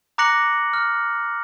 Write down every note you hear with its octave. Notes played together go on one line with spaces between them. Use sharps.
A#5 D6 F#6 A#6 C#7 F#7
F6